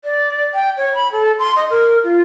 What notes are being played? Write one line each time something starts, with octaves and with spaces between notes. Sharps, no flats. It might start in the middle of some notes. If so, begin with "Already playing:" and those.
D5
G5
C#5
B5
A4
C6
D#5
A#4
F4